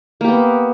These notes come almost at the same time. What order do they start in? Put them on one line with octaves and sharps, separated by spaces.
A#3 G4 B3